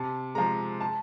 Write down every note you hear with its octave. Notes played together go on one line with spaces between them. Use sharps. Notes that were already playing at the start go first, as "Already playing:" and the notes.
Already playing: C3 A5
F3 G#3 A#5
A5